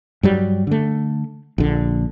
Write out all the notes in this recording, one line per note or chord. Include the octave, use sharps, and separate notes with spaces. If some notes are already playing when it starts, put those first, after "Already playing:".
G2 F#3 G3
D3 A3
A#1 D3